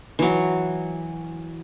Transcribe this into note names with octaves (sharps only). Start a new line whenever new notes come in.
E3 F#3